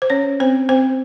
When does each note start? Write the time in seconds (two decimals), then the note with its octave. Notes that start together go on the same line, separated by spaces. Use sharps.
0.02 C5
0.10 C#4 C#5
0.40 C4 C5
0.69 C4 C5